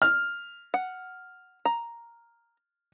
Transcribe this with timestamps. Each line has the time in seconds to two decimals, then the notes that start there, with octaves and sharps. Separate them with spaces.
0.02 F6
0.74 F#5
1.65 A#5